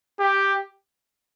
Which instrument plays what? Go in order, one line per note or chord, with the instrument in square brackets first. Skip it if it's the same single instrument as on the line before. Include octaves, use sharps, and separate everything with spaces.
[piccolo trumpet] G4